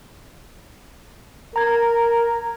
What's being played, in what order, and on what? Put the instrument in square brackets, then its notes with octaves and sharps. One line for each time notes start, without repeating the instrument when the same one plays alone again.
[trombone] A#4 [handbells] A#5 G#6